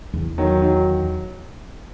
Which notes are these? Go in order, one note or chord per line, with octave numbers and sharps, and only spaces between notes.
E2
D#3 F#3
D#3 F#3